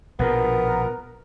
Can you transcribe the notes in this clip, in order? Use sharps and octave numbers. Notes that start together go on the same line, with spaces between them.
A#1 B2 F3 B3 A#4